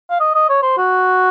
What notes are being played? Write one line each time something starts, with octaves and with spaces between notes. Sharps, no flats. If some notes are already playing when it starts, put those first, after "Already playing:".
F5
D#5
D#5
C#5
C5
F#4